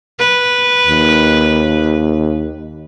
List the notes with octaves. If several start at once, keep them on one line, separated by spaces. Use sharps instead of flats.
B4
D#2